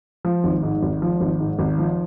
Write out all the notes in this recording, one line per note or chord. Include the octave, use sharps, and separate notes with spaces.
F3
G#1
G#2
G#1
F3
G#1
G#2
G#1
F3